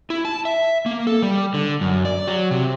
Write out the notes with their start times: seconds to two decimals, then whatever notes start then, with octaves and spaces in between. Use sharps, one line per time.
0.10 E4
0.25 A5
0.45 E5
0.86 A#3
1.07 A4
1.22 G3
1.54 D3
1.81 F#2
2.05 D5
2.28 F#3
2.51 C3